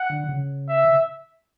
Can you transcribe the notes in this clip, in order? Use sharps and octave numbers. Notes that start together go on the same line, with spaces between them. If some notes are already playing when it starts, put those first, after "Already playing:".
Already playing: F#5
D3
C#3
E5